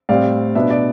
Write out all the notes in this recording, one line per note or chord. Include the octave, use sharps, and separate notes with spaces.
A2 G3 C4 D5 F5
B2 B3 D4 E5
D5